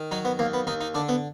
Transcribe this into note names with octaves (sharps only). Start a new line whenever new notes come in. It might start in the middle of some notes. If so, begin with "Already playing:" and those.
Already playing: D#3
F#3 D#4
B3
D#2 A#3
B3
D#2 D#4
D#4
D3 D4
B3